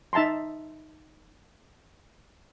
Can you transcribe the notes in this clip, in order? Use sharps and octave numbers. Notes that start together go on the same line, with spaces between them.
D#4 E5 A5 A#5 C6